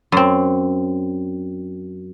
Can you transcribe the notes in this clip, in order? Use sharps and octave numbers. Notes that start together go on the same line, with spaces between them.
F#2 C4